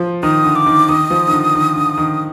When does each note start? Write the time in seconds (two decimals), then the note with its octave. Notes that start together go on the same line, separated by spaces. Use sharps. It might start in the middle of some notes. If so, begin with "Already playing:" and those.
Already playing: F3
0.23 D#3 D#6
0.44 D3
0.55 D6
0.66 D#3
0.89 D#3 D#6
1.10 F3
1.28 D#3
1.32 D3
1.55 D#3
1.76 D3
1.98 D#3